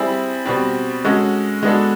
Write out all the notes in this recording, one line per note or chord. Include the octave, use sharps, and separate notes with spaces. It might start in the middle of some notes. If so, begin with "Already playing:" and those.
Already playing: G3 C4 E4 G#4
B2 G3 C4
G#3 C#4 F#4 A4
G#3 B3 D4 F#4 A4